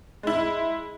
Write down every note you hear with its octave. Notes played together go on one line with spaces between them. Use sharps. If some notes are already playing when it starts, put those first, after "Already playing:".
G#3 E4